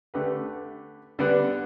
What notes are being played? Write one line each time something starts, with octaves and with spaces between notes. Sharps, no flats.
D3 A3 G4 B4
D3 G3 B3 D4 B4